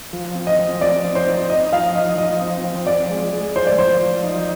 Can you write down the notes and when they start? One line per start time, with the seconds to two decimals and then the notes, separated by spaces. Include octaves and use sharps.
0.13 F3
0.35 C4
0.47 D#5
0.59 F3
0.81 F3 D5
1.04 C4
1.15 C5
1.26 D#4
1.49 D#4 D#5
1.73 F3 F5
1.95 D#4 D#5
2.18 F3 D#5
2.42 C4
2.64 C4
2.87 F3 D5
3.10 G#3
3.33 G#3
3.55 F3 C5
3.67 D5
3.79 F3 C5
4.01 F3
4.24 D#4